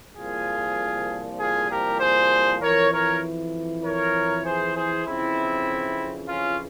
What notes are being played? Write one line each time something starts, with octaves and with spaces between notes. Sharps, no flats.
C2 A#2 F3 F4 G#4
F4 G#4
G4 A#4
G#4 C5
F2 E3 A#4 C#5
A#4 C#5
A#4 C#5
G#4 C5
G#4 C5
F2 C#3 E3 C4 E4
C#4 F4